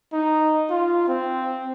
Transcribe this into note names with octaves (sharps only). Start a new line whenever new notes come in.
D#4
F4
C4